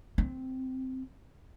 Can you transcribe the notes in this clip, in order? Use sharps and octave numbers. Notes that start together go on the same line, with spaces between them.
C4